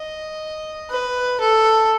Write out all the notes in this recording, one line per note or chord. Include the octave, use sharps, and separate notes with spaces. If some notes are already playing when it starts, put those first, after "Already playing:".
Already playing: D#5
B4
A4